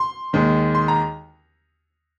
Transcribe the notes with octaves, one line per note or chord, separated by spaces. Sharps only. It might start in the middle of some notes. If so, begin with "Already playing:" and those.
Already playing: C6
D#2 D#3 G#3
C6
A#5